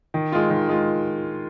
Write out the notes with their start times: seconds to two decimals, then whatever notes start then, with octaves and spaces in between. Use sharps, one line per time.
0.14 D#3
0.32 G#3 F4
0.50 D#3
0.69 G#3 F4